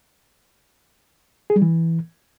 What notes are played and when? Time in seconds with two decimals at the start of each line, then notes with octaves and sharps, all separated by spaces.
1.50 G#4
1.56 G3
1.62 E3